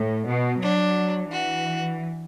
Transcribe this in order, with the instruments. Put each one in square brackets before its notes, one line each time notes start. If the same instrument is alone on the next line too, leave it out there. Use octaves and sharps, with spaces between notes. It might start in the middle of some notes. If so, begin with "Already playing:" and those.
Already playing: [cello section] A2
B2
[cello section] F#3 [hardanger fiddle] D4
[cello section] E3 [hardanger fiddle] F#4